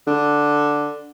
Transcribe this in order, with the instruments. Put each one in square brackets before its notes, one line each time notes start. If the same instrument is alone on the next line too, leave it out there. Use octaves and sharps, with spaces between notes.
[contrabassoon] D3